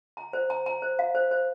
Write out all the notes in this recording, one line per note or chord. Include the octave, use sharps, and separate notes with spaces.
A#5
C5
A#5
A#5
C5
F5
C5
C5